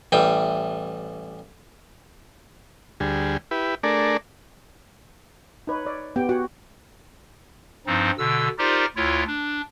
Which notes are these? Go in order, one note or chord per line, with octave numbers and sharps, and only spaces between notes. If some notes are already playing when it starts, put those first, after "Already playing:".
A1 E3 G3 G5
D2 G3 G#4
E4 G4 B4
A3 D4 G#4 A#4 D5
D#4 B4 C#5
C#5 D5
B3 G4 G5
F#4 F#5 G#5
G2 F3 C4 D#4
B2 D3 E6
D#4 F4 G4 A#4 C5 D5
D2 E4 F4 C#5
D4